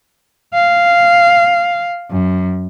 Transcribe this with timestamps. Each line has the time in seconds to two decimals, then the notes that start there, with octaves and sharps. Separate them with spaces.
0.54 F5
2.11 F#2